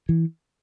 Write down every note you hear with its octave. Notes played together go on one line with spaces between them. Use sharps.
E3